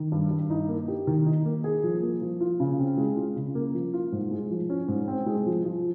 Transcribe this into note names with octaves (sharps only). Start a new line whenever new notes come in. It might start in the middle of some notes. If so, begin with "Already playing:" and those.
Already playing: D#3
G2
G2
D#4
A#3
G4
D#3
D#4
A#3
G#4
F3
A#3
F3
F4
C#3
C4
G#3
F4
C#3
A#3
F3
F4
G#2
G#3
F3
C#4
G#2
C4
G#3
F3
F3